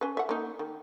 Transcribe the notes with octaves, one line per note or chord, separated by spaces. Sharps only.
C#4 B4
E5 F#5
A#3 D#4
D#3